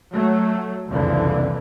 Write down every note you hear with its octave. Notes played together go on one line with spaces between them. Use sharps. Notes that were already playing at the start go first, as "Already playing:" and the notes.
F#3 A3
F#1 C2 F2 D3 E3